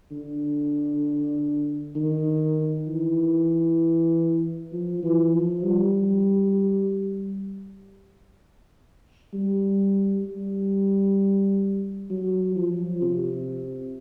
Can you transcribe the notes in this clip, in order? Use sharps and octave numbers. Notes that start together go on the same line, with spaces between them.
D3
D#3
E3
F3
E3
F3
G3
G3
G3
F#3
F3
C3